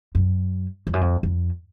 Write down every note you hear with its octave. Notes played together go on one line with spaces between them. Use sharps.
F#2
F2
F#2
F2
F2